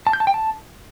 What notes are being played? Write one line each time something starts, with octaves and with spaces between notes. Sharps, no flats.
A5
G6
A5
G5
A5